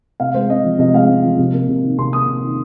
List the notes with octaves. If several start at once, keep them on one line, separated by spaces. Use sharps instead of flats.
C3 F5
G#3 C5
C4 D#5
F3
C3 D#5
G#3 F5
C4
F3
C3
A#3
C3
D#3
C3 C6
A#3 D#6
C3
D#3